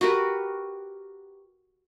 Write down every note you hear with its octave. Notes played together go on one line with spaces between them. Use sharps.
F#4 G4 A#4 B4